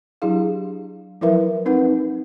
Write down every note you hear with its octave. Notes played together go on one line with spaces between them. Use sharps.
F#3 D4 E4 G4 G#4 F5
F3 F#3 E4 A#4 B4 E5
C4 D#4 B4 F#5